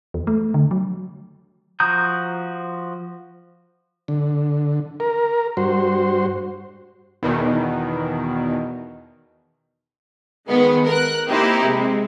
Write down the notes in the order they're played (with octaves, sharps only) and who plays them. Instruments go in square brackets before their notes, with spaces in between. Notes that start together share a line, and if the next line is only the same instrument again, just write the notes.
[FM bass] E2
A3
D3
F#3
[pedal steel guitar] F3 F#4 A#5 D#6 G6
[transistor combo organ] D3
A#4
G2 F#4 C5
[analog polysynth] E2 B2 D#3
[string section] D#3 G#3 B3
A#4 F#6
A#3 C4 D#4 E4 G4
C3 G#3